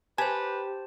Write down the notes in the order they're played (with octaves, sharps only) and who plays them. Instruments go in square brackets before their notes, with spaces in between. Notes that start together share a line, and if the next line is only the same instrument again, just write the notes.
[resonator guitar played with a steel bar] G4 [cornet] B4 [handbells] C5 A5 [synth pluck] G#5